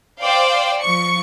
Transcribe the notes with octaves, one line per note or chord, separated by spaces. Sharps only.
C5 D5 F5 G5
F3 C#6 C#7